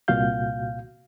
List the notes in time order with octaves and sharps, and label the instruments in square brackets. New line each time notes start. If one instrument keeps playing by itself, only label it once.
[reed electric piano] C2 A#2 F#4 F5 G6